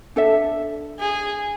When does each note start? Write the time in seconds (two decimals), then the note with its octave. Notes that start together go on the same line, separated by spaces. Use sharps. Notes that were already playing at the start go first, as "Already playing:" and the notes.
0.16 D4 A4 E5
0.99 G#4